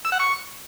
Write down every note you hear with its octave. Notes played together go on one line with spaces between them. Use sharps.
E6
F#5
C#6